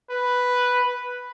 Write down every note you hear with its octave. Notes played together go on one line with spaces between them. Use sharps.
B4